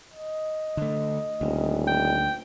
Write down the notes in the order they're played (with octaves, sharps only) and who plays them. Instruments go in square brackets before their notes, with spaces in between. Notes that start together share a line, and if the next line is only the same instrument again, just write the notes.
[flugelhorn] D#5
[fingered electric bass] D3 A3
[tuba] D#1 [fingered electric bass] D2
[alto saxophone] G5